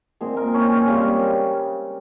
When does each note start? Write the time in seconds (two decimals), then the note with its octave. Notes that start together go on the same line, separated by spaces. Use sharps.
0.21 A#2 G#3 C4 G#4
0.37 A#4
0.54 C#4
0.87 C#3 G3 C4